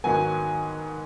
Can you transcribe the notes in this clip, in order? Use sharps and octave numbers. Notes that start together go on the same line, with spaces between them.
G#2 D#3 F#3 B3 G#5